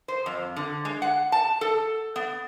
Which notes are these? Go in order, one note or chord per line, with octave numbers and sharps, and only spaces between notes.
C5
F2
D3
G#3
F#5
A5
A4
B3